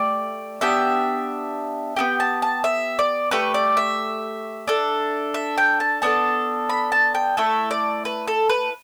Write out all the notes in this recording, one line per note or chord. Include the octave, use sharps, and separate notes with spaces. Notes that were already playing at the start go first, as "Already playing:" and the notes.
Already playing: A3 G4 D5
B3 D4 G4 E5
B3 E4 G4 G5
A5
A5
E5
D5
A3 G4 B4
D5
E5
D4 A4
E5
G5
A5
B3 D4 A4 A5
B5
A5
G5
A3 E4 A4 E5
D5
B4
A4
B4